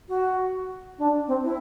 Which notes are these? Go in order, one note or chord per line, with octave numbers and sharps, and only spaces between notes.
F#4
D4
C4
E4